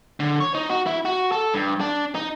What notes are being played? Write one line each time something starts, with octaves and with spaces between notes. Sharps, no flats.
D3
C#5
D#4
F#4
E4
F#4
A4
G2
D4
D#4